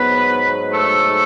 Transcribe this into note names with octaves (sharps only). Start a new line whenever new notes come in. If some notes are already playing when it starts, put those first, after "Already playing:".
Already playing: G#2 F#3 B3 B4
A3 A4